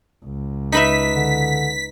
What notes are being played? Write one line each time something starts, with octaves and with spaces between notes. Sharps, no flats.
C#2
D#4 B4 E5 B6
D3